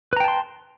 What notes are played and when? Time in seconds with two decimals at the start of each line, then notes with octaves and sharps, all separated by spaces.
0.13 B4
0.17 A#5
0.20 G5
0.24 A5
0.28 C6